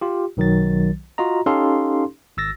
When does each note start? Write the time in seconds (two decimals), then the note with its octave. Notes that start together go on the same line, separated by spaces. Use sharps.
0.01 F4 G4
0.37 B1 D#3 F#3 A6
1.18 F4 F#4 D#5 A#5
1.46 C#4 D#4 G4 A4 F5 C6
2.37 G#1 E6 A6 A#6